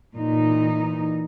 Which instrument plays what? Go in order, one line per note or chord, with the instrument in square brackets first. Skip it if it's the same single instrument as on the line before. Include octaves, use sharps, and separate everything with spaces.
[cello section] A#2 E3 D#4